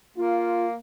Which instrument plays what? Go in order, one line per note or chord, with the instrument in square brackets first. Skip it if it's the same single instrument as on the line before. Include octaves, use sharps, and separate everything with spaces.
[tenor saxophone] A#3 [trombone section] F4